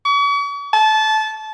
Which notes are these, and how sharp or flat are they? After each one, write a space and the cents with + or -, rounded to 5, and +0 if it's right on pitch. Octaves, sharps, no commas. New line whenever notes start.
C#6 +45
A5 -20